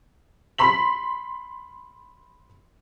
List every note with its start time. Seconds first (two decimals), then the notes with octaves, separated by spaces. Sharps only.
0.58 B5 C6 B6 F#7